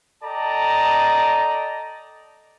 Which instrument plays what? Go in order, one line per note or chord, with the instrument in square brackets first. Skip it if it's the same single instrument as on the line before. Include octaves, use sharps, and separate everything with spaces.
[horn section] A4 D5 D#5 G5 A5 A#5